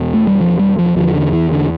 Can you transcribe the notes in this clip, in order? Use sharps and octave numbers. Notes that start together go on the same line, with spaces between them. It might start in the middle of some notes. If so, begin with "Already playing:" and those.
Already playing: E2 B2
A3
G3
F3
G3
F3
E2 D3 F3
D3
E3
D3